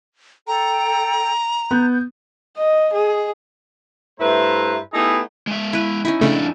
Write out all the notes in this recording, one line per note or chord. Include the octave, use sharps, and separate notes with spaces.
A4 G5 A#5
B3 G6
D#5
G#4
G2 A3 E4 B4 C5 A#5
A3 B3 D#4 E4 G4 G#4
G#3 E5
E4 B4
C#4 D#4 E4
F2 C#3 A3 D4